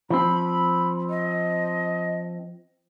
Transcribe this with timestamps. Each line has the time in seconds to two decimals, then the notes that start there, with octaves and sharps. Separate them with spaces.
0.10 F3 C4 B5
1.10 D#5